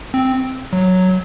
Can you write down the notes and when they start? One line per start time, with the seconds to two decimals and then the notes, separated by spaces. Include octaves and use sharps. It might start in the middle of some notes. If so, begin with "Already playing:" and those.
0.14 C4
0.73 F#3